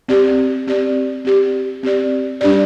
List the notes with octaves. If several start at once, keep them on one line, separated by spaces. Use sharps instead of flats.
C4 G4 D5
C4 G4 D5
C4 G4 D5
C4 G4 D5
G3 D4 G4 D5